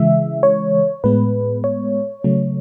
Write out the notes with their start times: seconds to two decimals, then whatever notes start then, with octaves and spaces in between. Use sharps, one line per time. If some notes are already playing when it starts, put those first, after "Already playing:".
Already playing: C#3 E3 G#3 E5
0.43 C#5
1.04 A2 G#3 B3 B4
1.64 C#5
2.24 C#3 F#3 A3